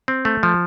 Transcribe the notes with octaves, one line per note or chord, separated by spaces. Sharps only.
C4
A3
F3